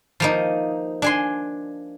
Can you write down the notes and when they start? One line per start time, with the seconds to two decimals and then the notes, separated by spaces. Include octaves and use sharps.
0.20 F3 A#3 D#4
1.02 D4 G#5 C6